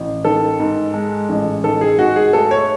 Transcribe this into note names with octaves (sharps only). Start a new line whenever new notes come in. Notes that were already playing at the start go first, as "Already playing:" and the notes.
Already playing: A1
D#3 A4
G#2
G#3
A1
D#3 A4
G#4
G#2 F#4
G#4
A3 A4
C#5